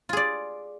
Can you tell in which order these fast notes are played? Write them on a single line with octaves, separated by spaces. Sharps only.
F4 G#4 D5